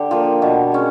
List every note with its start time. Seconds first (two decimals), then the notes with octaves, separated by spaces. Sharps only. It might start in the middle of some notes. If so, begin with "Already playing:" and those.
Already playing: D3 G4
0.11 F3 A#3
0.42 B2
0.72 G#3 C#4